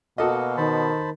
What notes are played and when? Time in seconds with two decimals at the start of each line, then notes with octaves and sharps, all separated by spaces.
0.18 B2 A#3 F#4 A4 D#5 F5
0.57 D#3 C5 A5 B5